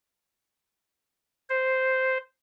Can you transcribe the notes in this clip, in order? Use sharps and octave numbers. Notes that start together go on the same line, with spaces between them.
C5